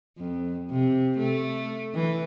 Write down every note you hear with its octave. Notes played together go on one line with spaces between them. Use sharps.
F2
C3
A3
E3